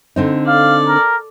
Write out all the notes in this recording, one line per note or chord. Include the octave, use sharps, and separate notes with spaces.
D3 C4 D#4
A4 D5 F5
A#4